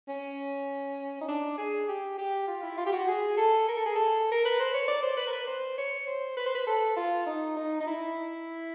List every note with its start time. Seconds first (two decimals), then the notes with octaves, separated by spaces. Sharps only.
0.08 C#4
1.21 D#4
1.28 D4
1.58 G#4
1.88 G4
2.18 G4
2.47 F4
2.63 E4
2.78 F4
2.86 G4
2.92 F#4
3.08 G#4
3.37 A4
3.68 A#4
3.77 A4
3.86 G#4
3.96 A4
4.32 A#4
4.45 B4
4.60 C5
4.73 C#5
4.88 D5
5.02 C5
5.17 B4
5.27 A#4
5.33 B4
5.47 C5
5.78 C#5
6.07 C5
6.37 B4
6.46 C5
6.55 B4
6.67 A4
6.97 F4
7.27 D#4
7.57 D#4
7.80 D#4
7.87 E4